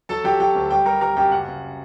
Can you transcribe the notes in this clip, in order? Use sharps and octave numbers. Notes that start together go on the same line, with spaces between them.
F#3 A4 A5
F#3 G4 G5
F#3 G4 G5
D2
G3 G4 G5
G3 A#4 A#5
G3 A#4 A#5
F#2 G4 G5
F#1 F#5
F#1